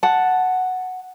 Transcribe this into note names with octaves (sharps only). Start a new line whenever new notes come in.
F#5 A5